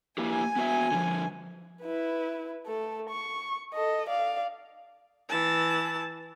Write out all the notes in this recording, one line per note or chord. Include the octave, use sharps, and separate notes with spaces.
A#3 E4 G4 G#5
B3 F#4 E5
D3 F3
E4 B4
A3 A4
C#6
A4 D#5
D5 F5
E3 A5